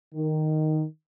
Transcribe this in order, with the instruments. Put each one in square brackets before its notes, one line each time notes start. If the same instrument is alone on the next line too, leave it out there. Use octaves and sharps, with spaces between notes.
[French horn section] D#3